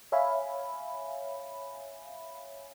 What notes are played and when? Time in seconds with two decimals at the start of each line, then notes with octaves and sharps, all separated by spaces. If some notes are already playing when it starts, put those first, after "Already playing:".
0.12 C#5 E5 F5 G#5 B5